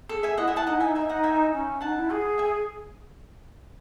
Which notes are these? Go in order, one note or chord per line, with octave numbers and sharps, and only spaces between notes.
G#4 A4
E5 G#5
E4 D#5 F#5
E5 G#5
F#5 A5
D#4 D#5 F#5
E4
D#4 E5 G#5
D#4 E5 G#5
D#5 F#5
E5 G#5
C#4
D#4 F#5 A5
E4
G#4
E5 G#5